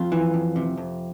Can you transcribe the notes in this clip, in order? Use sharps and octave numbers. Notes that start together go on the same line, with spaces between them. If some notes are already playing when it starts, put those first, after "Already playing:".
Already playing: F2 F4
E3
F2
C3
F2